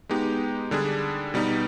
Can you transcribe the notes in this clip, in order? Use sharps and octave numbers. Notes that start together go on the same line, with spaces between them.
G#3 B3 D#4 G4
D3 G3 D4 G#4
B2 G3 B3 D#4